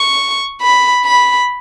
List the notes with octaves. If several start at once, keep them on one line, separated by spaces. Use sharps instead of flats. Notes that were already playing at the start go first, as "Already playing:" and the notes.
Already playing: C#6
B5
B5